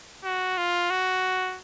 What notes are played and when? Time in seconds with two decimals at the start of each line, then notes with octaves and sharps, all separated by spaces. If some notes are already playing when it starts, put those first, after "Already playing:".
0.24 F#4
0.58 F4
0.91 F#4